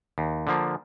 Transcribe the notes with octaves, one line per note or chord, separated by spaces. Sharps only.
D#2
D3 F3 A#3